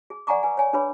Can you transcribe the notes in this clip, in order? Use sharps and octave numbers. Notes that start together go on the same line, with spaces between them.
G#4
D5 F#5 G#5 A#5 C#6 D6
B4 G#5
C#5 G#5
D4 G#4 B4 C#5 B5